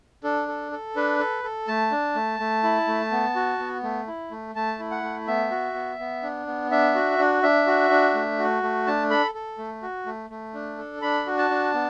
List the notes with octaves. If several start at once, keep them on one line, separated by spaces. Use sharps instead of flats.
D4 A4
A4
A4
D4 B4
A4
A4
A3 A5
D4
A3
A3
E4
A3
B3
F#4
B3
A3
E4
A3
A3 A5
E4
F#5
A3
B3 E5
F#4
B3
B3
D4
B3
D4 E5
F#4
D4
D4 E5
F#4
D4
A3
F#4
A3
D4 A5
A4 B5
A4
A3
F#4
A3
A3
D4
A4
D4 B5
F#4
A5
D4
B3